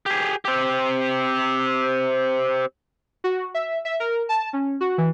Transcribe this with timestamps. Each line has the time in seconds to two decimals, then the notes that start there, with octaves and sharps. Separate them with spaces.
0.06 G4 G#4
0.45 C4 G4
3.24 F#4
3.54 E5
3.85 E5
4.00 A#4
4.29 A5
4.53 C#4
4.81 F#4
4.98 E3